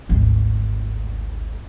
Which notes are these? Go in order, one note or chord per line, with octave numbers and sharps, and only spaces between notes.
G#1 D2